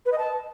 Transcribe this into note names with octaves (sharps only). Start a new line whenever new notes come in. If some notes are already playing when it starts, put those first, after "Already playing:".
B4
D#5
A5